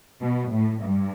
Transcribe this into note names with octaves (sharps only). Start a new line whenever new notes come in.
B2
A2
G2